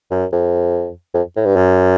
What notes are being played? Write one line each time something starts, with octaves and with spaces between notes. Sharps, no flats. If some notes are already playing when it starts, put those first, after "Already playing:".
F#2
F2
F2
A2
G2
F#2